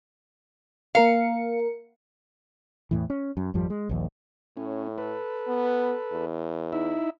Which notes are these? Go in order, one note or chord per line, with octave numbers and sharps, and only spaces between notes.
A#3 A#4 F5 C#7
E2 A2 E3
C#4
F#2
G#1 F2 F3 G3
G#3
A#1 D#2
A2 C#4
A4 B4
B3
E2
D#4 E4 E5